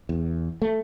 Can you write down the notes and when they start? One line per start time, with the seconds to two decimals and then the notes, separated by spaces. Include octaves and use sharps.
0.09 E2
0.62 A3